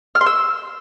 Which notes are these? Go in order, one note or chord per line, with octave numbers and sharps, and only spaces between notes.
F6
C6
E6